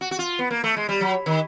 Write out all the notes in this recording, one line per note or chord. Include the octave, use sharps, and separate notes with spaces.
F#4
F#4
F4
B3
A#3
A3
G#3
G3
F#3
D#3